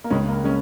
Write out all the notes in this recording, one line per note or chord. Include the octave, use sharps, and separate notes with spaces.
A#3
C#2 C#3 G#3 C#4
A#3
G#3 C#4